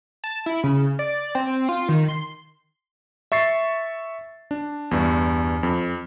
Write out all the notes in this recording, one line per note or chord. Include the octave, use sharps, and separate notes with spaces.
A5
E4
C#3
D5
C4
F4
D#3
C6
E5 C#6 A6 C7
D4
E2 G2
F2